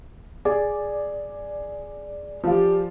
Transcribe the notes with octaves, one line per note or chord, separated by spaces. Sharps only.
G#4 D5
F3 F4 G4